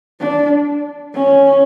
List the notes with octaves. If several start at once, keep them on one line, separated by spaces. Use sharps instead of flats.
D4
C#4